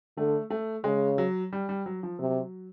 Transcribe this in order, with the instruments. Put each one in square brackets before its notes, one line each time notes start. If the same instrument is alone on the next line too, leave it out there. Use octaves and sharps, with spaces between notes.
[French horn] D3 [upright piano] A3
[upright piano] A3
[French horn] C#3 [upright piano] G#3
[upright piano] F#3
G3
G3
F#3
F3
[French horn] C3 [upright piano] F#3